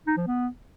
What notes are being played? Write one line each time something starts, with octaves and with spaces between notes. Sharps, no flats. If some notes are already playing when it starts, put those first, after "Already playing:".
D#4
F3
B3